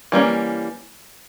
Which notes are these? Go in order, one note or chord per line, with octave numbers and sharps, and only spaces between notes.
E3 G3 A#3 C#4